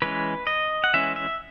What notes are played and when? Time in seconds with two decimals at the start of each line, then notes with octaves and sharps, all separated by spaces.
0.02 E3 G#3 C#4 B4
0.47 D#5
0.84 F#5
0.94 E3 G#3 C#4 E5
1.16 E5